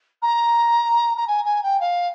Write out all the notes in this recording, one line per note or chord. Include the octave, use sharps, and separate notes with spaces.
A#5
A#5
G#5
G#5
G5
F5